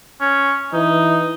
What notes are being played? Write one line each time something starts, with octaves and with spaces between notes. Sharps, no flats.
C#4
E3 D#4